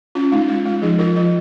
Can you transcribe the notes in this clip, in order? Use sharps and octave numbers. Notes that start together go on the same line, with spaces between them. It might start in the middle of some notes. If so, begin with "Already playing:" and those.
C#4 F4
G#3 D#4
G#3 F4
G#3 F4
F3 D#4 G#4
F3 F4 A#4
F3 F4